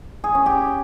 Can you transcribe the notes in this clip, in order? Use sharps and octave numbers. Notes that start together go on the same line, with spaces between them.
G#4
C#4
G4